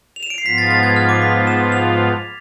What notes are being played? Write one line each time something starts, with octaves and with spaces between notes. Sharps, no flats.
F7
E7
D7
C7
G#2 F3 B3 F4 B6
A6
B6
A6
G#6
F6
D6
B6
E7
F7